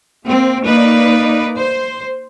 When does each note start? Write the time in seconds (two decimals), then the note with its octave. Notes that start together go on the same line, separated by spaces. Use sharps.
0.24 A#3 C4
0.65 A#3 D#4 B4 D5
1.56 C5